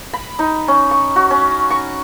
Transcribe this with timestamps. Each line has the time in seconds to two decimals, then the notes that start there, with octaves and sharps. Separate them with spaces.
0.13 B5
0.39 D#4
0.68 C#4
0.91 C#6
1.16 F#4
1.31 C#4
1.70 C#6